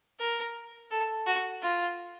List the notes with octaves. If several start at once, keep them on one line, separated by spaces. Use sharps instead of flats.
A#4
A4
F#4
F4